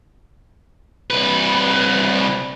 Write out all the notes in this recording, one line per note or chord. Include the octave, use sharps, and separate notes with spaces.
C2 B4